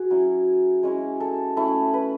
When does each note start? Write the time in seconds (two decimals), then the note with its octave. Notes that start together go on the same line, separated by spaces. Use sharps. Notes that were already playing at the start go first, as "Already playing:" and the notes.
Already playing: F#4 G#4
0.10 F#3 C#4 E4
0.83 G#3 C#4 E4
1.20 A4
1.57 A3 C#4 E4
1.94 B4